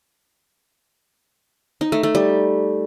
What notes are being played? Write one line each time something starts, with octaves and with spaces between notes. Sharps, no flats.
D#4
A3
A3
G3